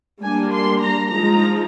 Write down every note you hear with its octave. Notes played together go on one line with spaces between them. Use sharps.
G3 A#3 D4 G#5
C6
A#5
F3 G#3 D#4 A#5